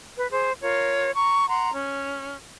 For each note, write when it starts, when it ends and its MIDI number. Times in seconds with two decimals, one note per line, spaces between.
0.16 0.29 71
0.30 0.51 68
0.30 0.51 72
0.61 1.10 65
0.61 1.10 70
0.61 1.10 73
1.14 1.45 82
1.14 1.45 85
1.47 1.70 78
1.47 1.70 82
1.47 1.70 84
1.72 2.37 61